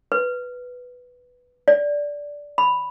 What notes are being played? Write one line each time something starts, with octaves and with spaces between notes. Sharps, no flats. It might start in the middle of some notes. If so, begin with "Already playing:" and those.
B4
D5
B5